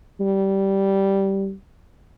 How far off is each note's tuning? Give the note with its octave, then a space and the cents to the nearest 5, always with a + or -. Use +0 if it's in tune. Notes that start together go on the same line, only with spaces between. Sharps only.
G3 -10